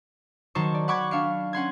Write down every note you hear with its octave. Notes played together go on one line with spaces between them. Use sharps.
D#3 F#3 D#4 C5 A5 C#6
D5
F#5 B5 C#6 D6 F#6 G#6
D4 F5 C#7
C#4 F#5 C6 G#6